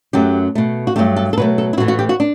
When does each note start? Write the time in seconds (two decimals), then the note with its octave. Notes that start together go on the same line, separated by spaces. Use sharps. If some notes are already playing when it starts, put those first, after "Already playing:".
0.13 F#2 F#3 A3 G4
0.55 B2 A3
0.87 F#4
0.96 G2 F#3 A3 G4
1.16 A4
1.33 A4
1.37 B2 F#3 A3 B4
1.58 A4
1.73 E4
1.77 A2 E3 A3 F#4
1.88 F#4
1.99 G4
2.09 F#4
2.20 D4